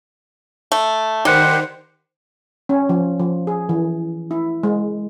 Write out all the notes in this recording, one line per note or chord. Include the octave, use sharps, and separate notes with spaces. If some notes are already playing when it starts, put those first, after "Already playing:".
A3
D#3 G3 G4 C5 F#5
C#4
F3
F3
G#4
E3
E4
G#3